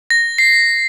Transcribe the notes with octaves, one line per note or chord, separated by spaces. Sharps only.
A#6
C7